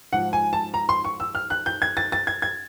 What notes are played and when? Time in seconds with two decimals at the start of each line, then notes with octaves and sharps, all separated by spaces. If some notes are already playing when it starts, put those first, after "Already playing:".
0.13 G#2 F3 F#5
0.33 G#5
0.53 A5
0.74 A#5
0.89 C6
1.04 C#6
1.20 E6
1.35 F6
1.50 F#6
1.66 G6
1.82 G#6
1.97 A6
2.12 A6
2.27 G#6
2.42 G#6